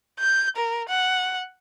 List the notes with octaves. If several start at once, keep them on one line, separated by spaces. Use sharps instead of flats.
G6
A#4
F#5